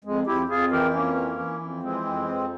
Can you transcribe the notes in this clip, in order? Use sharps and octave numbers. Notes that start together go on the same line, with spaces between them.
F2 G#3
F2 E4 G4
F2 F4 G#4
E3 G4 A#4
F2 A#3 C#4
E3
E3
F2
E3 G#3 C4
F2
F2